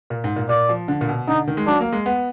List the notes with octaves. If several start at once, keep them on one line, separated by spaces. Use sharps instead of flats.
A#2
G#2
A#2
A#2 D5
F3
D3
A#2
B2
D3 D#4
D#3
G#3
F#3 D4
A#3
G#3
B3